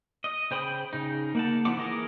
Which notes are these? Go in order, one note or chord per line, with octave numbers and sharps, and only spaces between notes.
D#5
C#3 C5 G5 B5 D#6
C#3 D#4
A#3 F#5 A5
F3 C4 E4 F#5 D6
E3 G#3 A#4 D#5